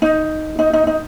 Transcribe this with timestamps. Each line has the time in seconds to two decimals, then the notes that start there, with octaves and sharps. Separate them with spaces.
0.02 D#4
0.59 D#4
0.73 D#4
0.87 D#4